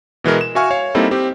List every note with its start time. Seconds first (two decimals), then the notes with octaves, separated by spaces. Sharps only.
0.24 B2 E3 G#3 A#4
0.41 E7
0.55 F#4 E5 F5 G#5 C#6 F6
0.71 C#5 F5
0.95 G3 A#3 C4 D#4 E4 A4
1.11 C4 G4